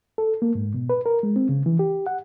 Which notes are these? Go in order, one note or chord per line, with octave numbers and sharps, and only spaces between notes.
A4
A#3
G#2
B2
B4
A#4
G#3
C4
C#3
E3
G4
F#5